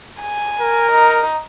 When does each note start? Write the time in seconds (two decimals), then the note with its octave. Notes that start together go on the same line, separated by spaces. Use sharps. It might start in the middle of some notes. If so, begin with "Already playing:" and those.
0.22 G#5
0.61 A#4
0.92 D#4